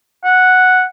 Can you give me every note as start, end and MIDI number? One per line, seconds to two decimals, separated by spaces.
0.24 0.84 78